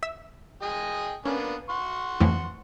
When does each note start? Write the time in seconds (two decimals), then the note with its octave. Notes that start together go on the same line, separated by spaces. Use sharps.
0.03 E5 E6
0.62 G#4 D#5 G5
1.25 A#3 B3 C#4 D4
1.70 F#5 C6 C#6
2.20 F2 A2 E3